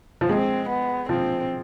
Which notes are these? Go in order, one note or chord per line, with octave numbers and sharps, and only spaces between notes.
F3
G#3 C4
B3
F3 C4